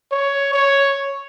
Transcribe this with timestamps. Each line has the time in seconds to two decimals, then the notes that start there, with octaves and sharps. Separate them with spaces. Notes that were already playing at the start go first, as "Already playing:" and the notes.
0.12 C#5
0.53 C#5